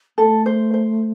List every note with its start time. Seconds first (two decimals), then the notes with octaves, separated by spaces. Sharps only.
0.18 A3 A4
0.46 C5
0.74 C5